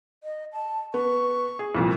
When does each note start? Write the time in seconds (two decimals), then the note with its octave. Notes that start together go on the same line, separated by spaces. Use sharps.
0.24 D#5
0.53 A5
0.94 B3 C#6
1.59 G#4
1.75 C2 F2 A#2